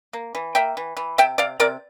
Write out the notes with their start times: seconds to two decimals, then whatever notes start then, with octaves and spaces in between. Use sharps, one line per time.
0.13 A#3
0.35 E3
0.55 A#3 E5 G5
0.77 E3
0.97 E3
1.18 C3 E5 G5
1.38 C3 D5 F5
1.60 C3 A#4 D5